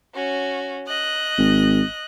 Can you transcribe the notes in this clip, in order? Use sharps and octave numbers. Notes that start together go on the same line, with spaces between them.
C#4 F#4
D#5 F#6
G#1